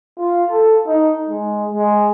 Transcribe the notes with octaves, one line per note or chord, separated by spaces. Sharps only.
F4
A4
D#4
G#3
G#3